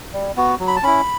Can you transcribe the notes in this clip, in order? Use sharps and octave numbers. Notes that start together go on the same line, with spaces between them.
G3
B3 F#4
F#3
B5
A5
C#4 E4 B5